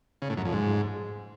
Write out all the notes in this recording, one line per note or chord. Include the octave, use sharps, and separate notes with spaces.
C#3
A2
F#2
F2
G#2